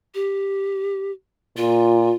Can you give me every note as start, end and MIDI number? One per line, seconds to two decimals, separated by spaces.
0.15 1.11 67
1.57 2.12 46
1.57 2.15 65